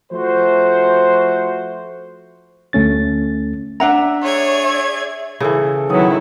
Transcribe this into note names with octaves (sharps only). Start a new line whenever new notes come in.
F3 A3 F#4 C5
D2 A3 C#4 A6
D4 E5 F#5 A#5
G#4 C#5 D5 G#6
E5
C#3 E3 A4 B4
D#3 F#3 B3 E4 F#5 D#6